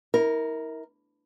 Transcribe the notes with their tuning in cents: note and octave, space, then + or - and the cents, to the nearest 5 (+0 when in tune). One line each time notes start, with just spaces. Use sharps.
E4 -40 A#4 +0